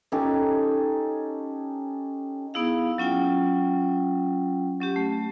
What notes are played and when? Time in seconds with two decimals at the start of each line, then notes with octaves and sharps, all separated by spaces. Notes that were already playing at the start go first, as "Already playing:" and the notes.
0.12 C#4 D#4 G4 A4
2.54 B3 D#4 E4 G#4 F5
2.98 F#3 C#4 F4 G5
4.80 F#3 C#4 G4
4.96 A3